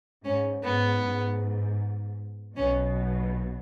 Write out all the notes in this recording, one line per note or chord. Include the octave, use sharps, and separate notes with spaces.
G#2 C#4
G#2 B3
G#2
B1 B2 C#4